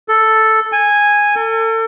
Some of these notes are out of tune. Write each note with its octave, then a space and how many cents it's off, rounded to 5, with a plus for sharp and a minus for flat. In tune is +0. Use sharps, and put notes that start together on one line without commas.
A4 +0
G#5 -10
A4 +35